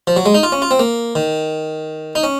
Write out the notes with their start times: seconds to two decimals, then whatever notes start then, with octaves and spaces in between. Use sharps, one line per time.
0.07 F3
0.17 F#3
0.26 G#3
0.35 D#4
0.43 F4
0.52 C#4
0.62 F4
0.71 C4
0.79 A#3
1.15 D#3
2.15 D#4
2.23 C#4